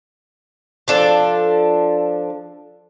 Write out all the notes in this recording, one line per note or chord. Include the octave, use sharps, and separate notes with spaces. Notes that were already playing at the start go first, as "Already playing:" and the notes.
F3 D4 A4